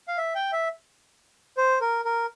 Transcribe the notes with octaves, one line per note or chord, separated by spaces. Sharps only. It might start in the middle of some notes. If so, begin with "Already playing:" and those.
F5
E5
G5
E5
C5
A#4
A#4